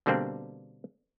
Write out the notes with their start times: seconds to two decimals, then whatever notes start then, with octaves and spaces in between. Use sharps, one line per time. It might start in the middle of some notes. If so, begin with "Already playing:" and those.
0.06 B2 D3 G3 A#3 C4 D4